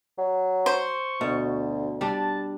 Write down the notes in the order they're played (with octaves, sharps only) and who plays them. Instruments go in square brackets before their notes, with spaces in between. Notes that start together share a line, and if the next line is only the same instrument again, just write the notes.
[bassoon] F#3
[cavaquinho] C5 [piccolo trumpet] C#6
[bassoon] D2 [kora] B2
[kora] G3 D4 [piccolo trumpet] A5